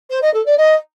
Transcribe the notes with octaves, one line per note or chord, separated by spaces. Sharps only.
C5
D#5
A4
D5
D#5